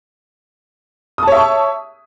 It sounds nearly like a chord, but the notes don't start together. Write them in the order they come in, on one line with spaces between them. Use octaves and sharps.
D#6 A5 C#5 E5 C#6